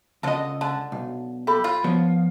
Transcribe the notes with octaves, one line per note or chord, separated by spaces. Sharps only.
C#2 D3 F3 A4 D#5
D3 A5
B1
G4 A4 B5
F4
F3 B3 C#5